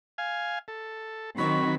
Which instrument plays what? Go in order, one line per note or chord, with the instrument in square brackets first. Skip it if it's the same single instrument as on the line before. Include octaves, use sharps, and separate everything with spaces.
[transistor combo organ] F5 G#5
A4
[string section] D#3 C4 [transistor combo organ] F#3 B5 [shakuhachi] C#6